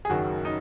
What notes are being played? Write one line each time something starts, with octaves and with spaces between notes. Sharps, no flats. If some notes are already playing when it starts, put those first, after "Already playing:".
G#4
F#1 F#2 D#3 F#3 F#4
D#4